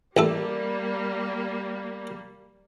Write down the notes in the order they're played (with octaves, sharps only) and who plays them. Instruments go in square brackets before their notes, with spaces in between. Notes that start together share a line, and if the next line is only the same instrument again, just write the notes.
[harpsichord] A1 A3 A4 [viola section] G3 A#3